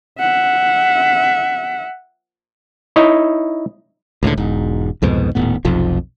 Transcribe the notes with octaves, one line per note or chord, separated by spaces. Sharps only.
E5 F#5
D#4 E4 C#5 D#5
C#2 A2 D3
E1 G#2
C2 F2 G#2 B2
D#1 A2 B3
F1 B1 F2 F3